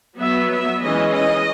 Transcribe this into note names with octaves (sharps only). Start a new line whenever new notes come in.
F#3 B3 E5
E5
E3 G#3 C#4 D#5
D#5